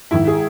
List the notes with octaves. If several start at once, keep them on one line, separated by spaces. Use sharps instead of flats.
G#2 D#3 E4
G#4